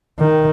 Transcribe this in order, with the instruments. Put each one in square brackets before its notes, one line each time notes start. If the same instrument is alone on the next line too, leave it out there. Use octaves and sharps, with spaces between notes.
[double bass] D#3